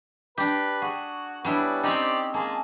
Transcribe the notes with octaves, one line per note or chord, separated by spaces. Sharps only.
D4 G4 B4
F#4 G#4
G3 B3 C#4 D4 E4
C4 C#4 D#4 G4 C5 D5
G#3 A#3 G#4 A5